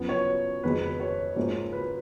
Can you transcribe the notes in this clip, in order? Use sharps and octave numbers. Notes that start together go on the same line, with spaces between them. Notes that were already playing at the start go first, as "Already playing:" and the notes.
Already playing: F#2 F3 B3
C#5
F2 D#3 G#3 B3 B4
B4
C#5
G#2 F3 A#3 C#4
B4